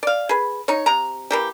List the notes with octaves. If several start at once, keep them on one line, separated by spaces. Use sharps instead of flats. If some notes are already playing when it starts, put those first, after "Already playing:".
D5 F5
G#4 B4
D#4 C#5
C3 A#5
E3 A#3 G4